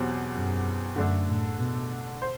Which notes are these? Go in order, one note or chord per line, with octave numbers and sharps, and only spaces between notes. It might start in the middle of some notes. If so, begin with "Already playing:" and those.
Already playing: E2 B2 F#3 C4 G4
F#2
F#2 D3 A3 D4 A4
A2
B2
C5